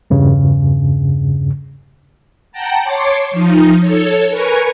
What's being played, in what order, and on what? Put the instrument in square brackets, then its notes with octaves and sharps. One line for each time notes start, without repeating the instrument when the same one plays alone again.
[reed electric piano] E2 G2 C#3
[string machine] F#5 G5 A5 A#5
C#5 A5 C6 D6 C7 C#7
F3 D#4
A4 C#5
A#4 B4 G#5 C#6